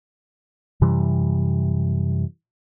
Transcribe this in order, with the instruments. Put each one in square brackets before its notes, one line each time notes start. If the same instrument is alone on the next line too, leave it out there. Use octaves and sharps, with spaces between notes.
[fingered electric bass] F#2 C3 E3 G3